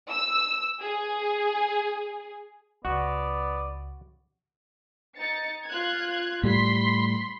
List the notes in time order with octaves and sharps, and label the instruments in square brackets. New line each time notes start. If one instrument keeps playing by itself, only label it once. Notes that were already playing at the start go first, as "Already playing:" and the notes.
[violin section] E6
G#4
[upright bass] C#2 [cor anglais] B3 [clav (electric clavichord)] F#4 [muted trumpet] D5
[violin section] D#4 A6 C#7
F4 F#6 G#6
[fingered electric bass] A2 G3 [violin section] B5 C6 B6